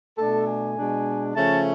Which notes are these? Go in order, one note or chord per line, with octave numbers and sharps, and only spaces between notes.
B2 A3 D4 A4
G#5
B2 G#3 D4
C#3 F3 A3 C#4 A5